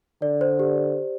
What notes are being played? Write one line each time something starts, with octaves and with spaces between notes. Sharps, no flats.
D3 D5
C5
G4